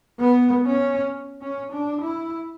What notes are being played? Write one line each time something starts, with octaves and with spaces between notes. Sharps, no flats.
B3
C#4
C#4
D4
E4